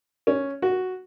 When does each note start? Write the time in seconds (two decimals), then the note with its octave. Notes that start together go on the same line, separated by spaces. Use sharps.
0.27 C#4
0.62 F#4